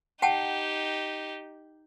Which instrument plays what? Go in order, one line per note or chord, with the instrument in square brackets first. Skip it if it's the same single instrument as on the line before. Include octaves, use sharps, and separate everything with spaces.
[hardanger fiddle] D#4 G4 [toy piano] F#5 G5 A5